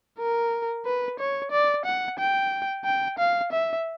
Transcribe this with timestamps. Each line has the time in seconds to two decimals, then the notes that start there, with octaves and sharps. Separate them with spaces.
0.19 A#4
0.85 B4
1.19 C#5
1.52 D5
1.86 F#5
2.19 G5
2.85 G5
3.19 F5
3.52 E5